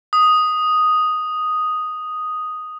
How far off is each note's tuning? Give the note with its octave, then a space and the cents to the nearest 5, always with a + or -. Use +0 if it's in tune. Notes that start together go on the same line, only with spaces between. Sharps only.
D#6 +0